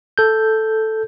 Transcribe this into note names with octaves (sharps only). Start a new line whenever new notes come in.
A4 G6